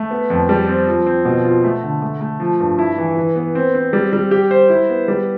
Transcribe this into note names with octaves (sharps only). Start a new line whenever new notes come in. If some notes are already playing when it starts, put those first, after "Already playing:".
Already playing: A3
B3
F2
G3
C4
F3
C4
B2
F4
A3
D3
A3
A3
F3
G2
E4
E3
E3
B3
C4
C4
G3
G3
G4
C5
E4
B3
G3